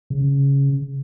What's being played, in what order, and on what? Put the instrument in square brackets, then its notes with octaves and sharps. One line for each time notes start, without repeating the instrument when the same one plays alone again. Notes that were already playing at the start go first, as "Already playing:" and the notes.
[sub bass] C#3